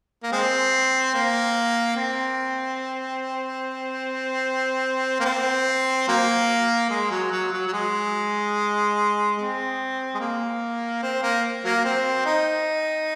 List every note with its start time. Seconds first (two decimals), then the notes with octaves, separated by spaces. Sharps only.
0.24 A#3
0.32 G#3 C4
1.14 A#3
1.96 C4
5.20 A#3
5.26 C4
6.08 F#3 A#3
6.90 G#3
7.11 F#3
7.32 F#3
7.52 F#3
7.67 F#3
7.73 G#3
9.38 G#3 C4
10.15 G#3
10.20 A#3
11.03 C4
11.23 A#3
11.64 F#3 A#3
11.85 C4
12.26 D#4